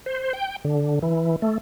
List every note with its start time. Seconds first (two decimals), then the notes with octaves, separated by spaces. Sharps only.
0.06 C5
0.33 G5
0.65 D3
1.02 E3
1.42 A3